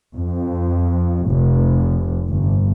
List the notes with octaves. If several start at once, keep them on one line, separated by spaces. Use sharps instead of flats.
F2
F1
G1